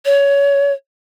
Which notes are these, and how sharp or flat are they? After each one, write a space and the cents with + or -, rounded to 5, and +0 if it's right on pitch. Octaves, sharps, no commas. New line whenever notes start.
C#5 +20